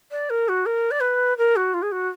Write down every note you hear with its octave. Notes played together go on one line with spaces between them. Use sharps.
D5
A#4
F#4
A#4
D5
B4
A#4
F#4
F4
G#4
F#4